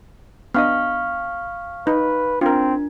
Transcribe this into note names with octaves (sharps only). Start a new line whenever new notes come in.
B3 D4 D#5 F5 C#6 F6
D#4 B4
C4 D4 F4 A#4